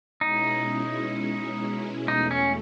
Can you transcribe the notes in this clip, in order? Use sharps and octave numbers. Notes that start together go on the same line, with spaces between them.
B2 G#3 C#4 D#4 E4
E2 B2 A3 D#4
C#4